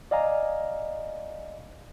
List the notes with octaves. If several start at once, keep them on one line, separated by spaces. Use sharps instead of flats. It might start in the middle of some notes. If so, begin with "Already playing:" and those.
D5 D#5 F5 G#5 A#5